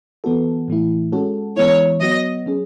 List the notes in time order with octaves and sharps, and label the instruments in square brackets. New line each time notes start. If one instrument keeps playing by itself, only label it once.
[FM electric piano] E3 B3 F#4 A4
A2 E3 A3 E4
G#3 C#4 F#4 A4
[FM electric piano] E3 G#3 B3 E4 [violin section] C#5
[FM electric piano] F#3 B3 F#4 [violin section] D#5
[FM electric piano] F#3 C#4 G#4